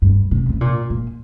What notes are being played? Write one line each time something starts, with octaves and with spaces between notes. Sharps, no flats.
G2
C3
C3
A#2
A#2